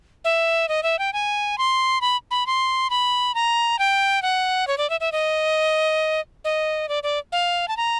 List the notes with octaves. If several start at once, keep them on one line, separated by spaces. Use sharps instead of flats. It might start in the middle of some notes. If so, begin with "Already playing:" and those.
E5
D#5
E5
G5
G#5
C6
B5
B5
C6
B5
A#5
G5
F#5
C#5
D5
E5
E5
D#5
D#5
D5
D5
F5
A5
A#5